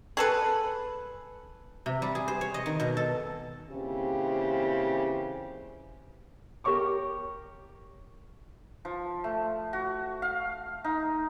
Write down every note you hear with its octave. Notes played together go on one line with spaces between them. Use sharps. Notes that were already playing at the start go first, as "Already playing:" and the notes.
G#4 A4 B4
C3
G3
G#4
C5
C#5
D#5
D#3
B2
A4
A#2 C#3 E3 C4 G4
G4 A#4 C#5 C#6 D6
F3
A3
F#4
F5
D#4